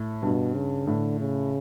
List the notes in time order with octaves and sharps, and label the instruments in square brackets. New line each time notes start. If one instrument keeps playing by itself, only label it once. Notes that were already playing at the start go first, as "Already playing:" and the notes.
Already playing: [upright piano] A2
[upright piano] G2 [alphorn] B2
[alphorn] C#3
[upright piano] A2 [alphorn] D3
[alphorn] C#3